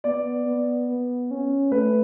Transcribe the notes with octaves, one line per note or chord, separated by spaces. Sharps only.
B3 D5
B3
B3
C#4
A3 B4